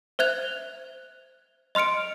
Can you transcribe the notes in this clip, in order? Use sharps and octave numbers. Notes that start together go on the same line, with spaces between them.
C5 E5 F#6 G#6 F7
D#5 C6 F6 C#7 D7